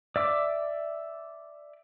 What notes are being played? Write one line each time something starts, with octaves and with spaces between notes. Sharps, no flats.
D5 E5 D6